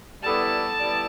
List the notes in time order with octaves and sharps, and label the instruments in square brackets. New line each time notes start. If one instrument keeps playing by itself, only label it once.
[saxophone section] G3 B3 E4 A4 D5 [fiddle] A5
[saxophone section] G3 B3 E4 A4 D5